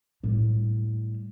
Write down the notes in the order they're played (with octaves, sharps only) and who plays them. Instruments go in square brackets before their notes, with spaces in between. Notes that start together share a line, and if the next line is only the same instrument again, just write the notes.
[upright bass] A2 G3